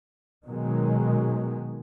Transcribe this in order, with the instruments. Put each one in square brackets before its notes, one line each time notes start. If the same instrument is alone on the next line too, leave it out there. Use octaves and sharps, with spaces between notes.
[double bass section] B2 D#3 F#3 G#3